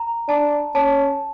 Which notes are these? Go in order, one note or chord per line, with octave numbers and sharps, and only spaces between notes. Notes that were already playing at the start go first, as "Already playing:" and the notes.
Already playing: A#5
D4 A5
C#4 A5